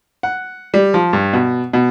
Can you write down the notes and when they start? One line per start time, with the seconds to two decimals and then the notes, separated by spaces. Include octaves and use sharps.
0.23 F#5
0.74 G3
0.94 F3
1.13 G2
1.33 B2
1.73 B2